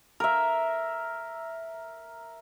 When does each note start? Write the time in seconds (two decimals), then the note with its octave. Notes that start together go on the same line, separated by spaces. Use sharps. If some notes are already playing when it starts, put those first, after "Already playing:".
0.20 A#4 E5